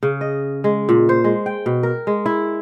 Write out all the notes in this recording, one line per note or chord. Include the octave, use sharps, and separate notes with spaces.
C#3
D#5
G#3
A#2
C5
G#3
G5
B2
A#4
G#3
E4